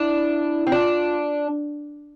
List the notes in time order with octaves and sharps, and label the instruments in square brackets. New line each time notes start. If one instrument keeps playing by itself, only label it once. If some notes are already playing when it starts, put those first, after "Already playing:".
Already playing: [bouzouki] D4 [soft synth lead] E4
[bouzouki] C4
[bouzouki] D4 [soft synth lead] F4